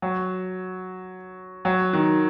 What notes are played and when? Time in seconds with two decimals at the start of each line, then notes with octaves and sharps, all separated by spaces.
0.02 F#3
1.65 F#3
1.93 D#3